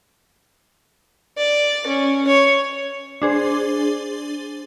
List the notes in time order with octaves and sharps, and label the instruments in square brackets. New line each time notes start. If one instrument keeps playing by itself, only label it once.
[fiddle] D5
C#4
C#5
[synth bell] D4 G#4 C5